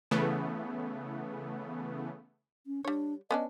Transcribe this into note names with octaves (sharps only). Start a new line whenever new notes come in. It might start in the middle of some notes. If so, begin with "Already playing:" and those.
C#3 E3 A3 B3
C#4
G3 D4 C#5
B3 C#4 D4 D#5